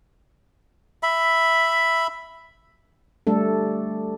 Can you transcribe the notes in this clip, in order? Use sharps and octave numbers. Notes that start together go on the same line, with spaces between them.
E5 B5
G3 A3 D4 A4